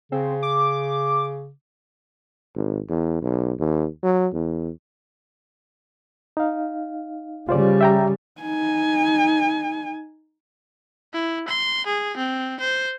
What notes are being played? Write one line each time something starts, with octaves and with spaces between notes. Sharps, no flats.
C#3 C4
D6
G#1
E2
B1
D#2
F#3
E2
D#4 F5
C#3 G3 F4 C5 D5
E5 G5 A#5
D#4 G#5
E4
C6
G#4
C4
C5